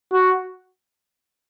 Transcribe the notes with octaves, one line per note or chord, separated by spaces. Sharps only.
F#4